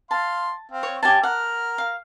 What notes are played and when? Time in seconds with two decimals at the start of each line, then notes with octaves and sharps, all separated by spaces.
0.11 F5 A5 C6
0.72 C4 F5
0.83 C#5
1.03 C#4 G4 G#5 A5
1.23 A#4 F#5 F6
1.78 F5